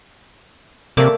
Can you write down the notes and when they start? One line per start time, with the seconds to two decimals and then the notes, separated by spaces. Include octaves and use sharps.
0.97 C3 A3 A#3 D5